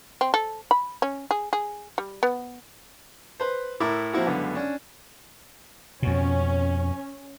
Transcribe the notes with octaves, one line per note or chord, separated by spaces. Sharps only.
C4
A4
B5
C#4
G#4
G#4
G3
B3
B4 C5
A2 E4 A#4 D6
F3 A#3 C4 E4 F#4
C#2 F#2 D3 B3
C#4 D4
F2 B2 C#4